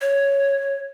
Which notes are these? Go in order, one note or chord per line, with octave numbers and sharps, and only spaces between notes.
C#5